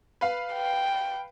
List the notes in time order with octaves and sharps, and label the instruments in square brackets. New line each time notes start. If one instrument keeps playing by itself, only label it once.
[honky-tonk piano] B4 F5
[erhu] G5